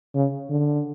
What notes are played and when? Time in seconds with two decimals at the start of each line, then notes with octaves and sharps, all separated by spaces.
0.15 C#3
0.50 D3